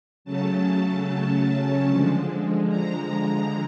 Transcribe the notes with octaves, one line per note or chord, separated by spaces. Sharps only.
C#3 F#3 A3 C#4 A5
D3 F3 G#3
A#5